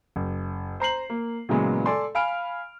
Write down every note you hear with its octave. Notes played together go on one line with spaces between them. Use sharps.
F#1
C5 A#5 C7 F#7
A#3
A#2 C#3 E3 F#3 G#3 B3
A4 D5 G#5 C6
F5 G#5 B5 F6 D7